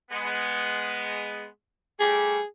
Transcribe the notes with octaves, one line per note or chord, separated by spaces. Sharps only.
G#3 B3
G3 A3 G4 G#4